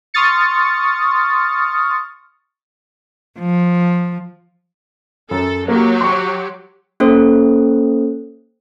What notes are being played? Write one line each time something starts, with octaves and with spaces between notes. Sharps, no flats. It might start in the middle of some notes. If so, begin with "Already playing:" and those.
C6 C#6 D#6 F6 A6 C#7
F3
F#2 A4
F#3 A#3 G4
C6 C#6
A#3 C#4 A4 C5